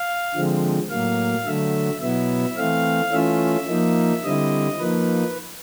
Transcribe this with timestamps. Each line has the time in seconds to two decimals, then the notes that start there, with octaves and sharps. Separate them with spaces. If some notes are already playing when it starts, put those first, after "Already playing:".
Already playing: F5
0.34 D3 F3 G#3 C4
0.90 A2 F#3 A#3 F5
1.46 D3 F#3 A3 E5
2.01 B2 F#3 B3 E4 E5
2.57 E3 A3 C4 F5
3.12 E3 A3 C#4 F4 E5
3.68 F3 A#3 D#4
4.23 D3 G3 C4 E4 D#5
4.79 F3 A#3 D#4 B4